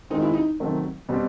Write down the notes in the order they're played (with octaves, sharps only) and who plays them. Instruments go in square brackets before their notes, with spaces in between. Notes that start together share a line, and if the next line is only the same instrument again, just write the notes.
[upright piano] D#3 G#3 C4 [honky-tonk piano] D#4
[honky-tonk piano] E4
D#4
[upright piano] C3 D#3 F#3 A3 C4
B2 G3 C4